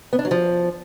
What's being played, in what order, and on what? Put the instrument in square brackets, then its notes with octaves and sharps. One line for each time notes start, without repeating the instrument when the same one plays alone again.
[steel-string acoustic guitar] B3
D4
F#3
F3